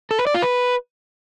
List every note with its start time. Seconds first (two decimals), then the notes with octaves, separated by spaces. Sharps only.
0.11 A4
0.19 B4
0.27 D5
0.35 F4
0.42 B4